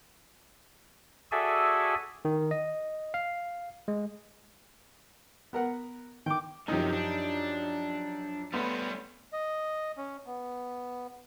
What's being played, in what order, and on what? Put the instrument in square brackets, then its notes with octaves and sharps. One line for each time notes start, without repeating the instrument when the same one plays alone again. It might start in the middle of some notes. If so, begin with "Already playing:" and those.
[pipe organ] F#4 G#4 A4 D5 E5 G#5
[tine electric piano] D#3
D#5
F5
G#3
[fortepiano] B3 A#4 F#5
[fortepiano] D#3 [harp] G5 D6
[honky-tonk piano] F#2 F3 [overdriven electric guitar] C3 D#3 [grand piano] D#4 G4
[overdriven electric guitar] D4
[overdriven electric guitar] G3 C#4 [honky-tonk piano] A3 B5 C6 [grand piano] B3
[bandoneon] D#5
C#4
B3